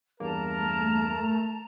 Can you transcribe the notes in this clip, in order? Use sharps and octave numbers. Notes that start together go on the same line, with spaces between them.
E2 G2 A#3 A#4 A5 A#5
A3